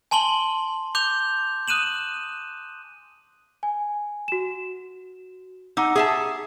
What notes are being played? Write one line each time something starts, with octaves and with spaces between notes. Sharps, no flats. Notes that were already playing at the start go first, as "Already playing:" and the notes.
G#5 A5 C6 F#7 G7
D6 G6 F7 G7
D#6 F#6 D#7 E7 F#7
G#5
F#4 E7
D#4 F#5 D6 E6
G#4 E5 A5